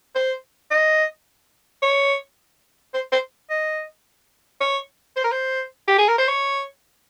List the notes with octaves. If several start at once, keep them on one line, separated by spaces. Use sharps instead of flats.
C5
D#5
C#5
C5
C5
D#5
C#5
C5
A#4
C5
G4
G#4
A#4
C5
C#5